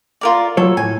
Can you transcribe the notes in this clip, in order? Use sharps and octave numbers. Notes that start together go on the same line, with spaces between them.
F4 A#4 D5
F#3 F4 A4 C#5
A2 G#5